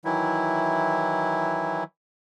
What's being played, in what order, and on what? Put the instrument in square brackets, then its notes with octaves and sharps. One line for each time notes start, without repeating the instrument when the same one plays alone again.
[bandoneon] D#3 E3 F#3 E4